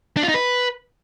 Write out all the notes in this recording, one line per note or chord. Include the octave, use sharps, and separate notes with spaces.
D4
F4
D#4
B4